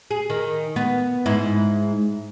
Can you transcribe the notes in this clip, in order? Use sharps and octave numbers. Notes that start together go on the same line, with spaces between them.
G#4
D#3
B3
G#2 E4